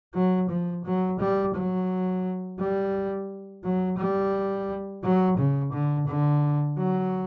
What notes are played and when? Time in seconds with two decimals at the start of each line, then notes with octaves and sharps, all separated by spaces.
0.14 F#3
0.49 F3
0.85 F#3
1.20 G3
1.55 F#3
2.59 G3
3.64 F#3
3.98 G3
5.04 F#3
5.38 C#3
5.73 D3
6.07 D3
6.78 F#3